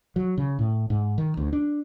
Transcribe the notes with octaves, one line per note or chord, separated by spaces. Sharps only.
F#3
C#3
A2
G#2
D#3
D2
D4